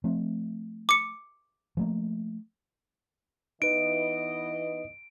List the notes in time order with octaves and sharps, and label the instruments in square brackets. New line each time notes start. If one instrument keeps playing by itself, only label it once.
[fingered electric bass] F3 A3 C4
[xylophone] D6 C#7
[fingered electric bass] F3 A3 A#3
[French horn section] E3 B3 D#5 [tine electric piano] D#4 B4 [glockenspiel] D7